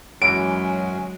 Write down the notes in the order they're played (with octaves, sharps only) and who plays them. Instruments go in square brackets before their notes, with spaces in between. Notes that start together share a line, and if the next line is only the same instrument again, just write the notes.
[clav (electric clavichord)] F#2 E3 F#4 [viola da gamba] F#3 G#3 [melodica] C#4 [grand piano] D7